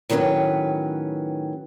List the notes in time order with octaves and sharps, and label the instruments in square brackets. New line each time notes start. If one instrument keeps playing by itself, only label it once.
[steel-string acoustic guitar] A2 D#3 F#3 A3 C#4 B4